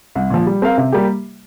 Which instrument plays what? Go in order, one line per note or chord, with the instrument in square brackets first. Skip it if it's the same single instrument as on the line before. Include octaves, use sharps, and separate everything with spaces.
[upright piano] C2
A#2 F3
G3
C4 A#4 F5
C3
G3 A#3 G4